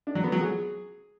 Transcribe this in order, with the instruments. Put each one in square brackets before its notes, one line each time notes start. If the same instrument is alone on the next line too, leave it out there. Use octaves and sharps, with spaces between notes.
[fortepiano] D4
F#3
B3
F#3
G#4